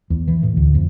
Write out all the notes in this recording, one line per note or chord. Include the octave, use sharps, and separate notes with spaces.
E2
E3
A2
D2
F2